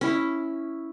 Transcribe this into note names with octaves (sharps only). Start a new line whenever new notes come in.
C#4 E4